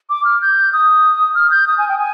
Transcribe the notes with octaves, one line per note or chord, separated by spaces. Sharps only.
D6
F6
G6
D#6
F6
G6
D#6
G#5
G5
G#5